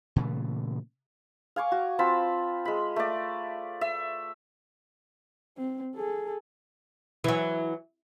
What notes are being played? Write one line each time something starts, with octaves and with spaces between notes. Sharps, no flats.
A#2 C#3 E3 A3
F5 G#5 C#6 D6
F#4
C4 F4 A5 B5
G#3 B5
A3 D5
E5
C4
G#4 A4
E3 F#3